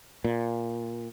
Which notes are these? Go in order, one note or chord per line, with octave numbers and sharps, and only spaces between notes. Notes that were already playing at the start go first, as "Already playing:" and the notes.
A#2